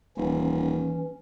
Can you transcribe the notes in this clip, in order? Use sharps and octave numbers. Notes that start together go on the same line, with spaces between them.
D#1 E3 C#4